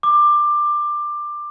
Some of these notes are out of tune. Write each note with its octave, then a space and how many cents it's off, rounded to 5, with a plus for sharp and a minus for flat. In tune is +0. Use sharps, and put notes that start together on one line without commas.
D6 +15